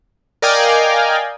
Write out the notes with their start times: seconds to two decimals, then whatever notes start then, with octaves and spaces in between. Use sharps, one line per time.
0.42 A#4 D5 D#5 F5 G5 G#5